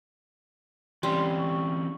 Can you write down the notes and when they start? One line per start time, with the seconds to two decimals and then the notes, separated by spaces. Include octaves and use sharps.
1.03 E3 G3 C4 C#4 C6
1.39 C#6